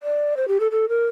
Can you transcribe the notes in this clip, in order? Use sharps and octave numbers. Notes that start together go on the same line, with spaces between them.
D5
C5
G4
A4
A4
A#4